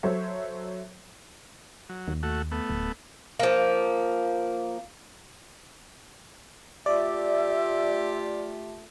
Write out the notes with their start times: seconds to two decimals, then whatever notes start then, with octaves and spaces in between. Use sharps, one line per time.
0.03 F#3 A4 C5 C#5 E5
1.89 F#3
2.08 D#2
2.23 A3 F#4
2.52 A3 B3
2.70 D1
3.40 F3 A#3
6.86 A3 F4 G4 D5 E5